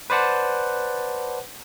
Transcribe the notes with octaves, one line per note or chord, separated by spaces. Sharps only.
B4 C5 D5 F#5 A5